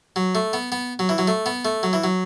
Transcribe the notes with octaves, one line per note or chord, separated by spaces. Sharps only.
F#3
A3
B3
B3
F#3
E3
F#3
A3
B3
A3
F#3
E3
F#3